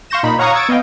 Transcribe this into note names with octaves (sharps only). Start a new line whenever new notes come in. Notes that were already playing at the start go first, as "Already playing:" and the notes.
F5 C6 C#6 G6 A#6 E7
A#2 D#4 B5
C#5 F5 F#5 A#5 C#6 D#6
C#6 D#6 E6 G#6 A6 D7
B3 D#5 F5 G5